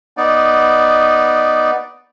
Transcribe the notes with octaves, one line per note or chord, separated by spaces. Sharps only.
B3 D#4 D5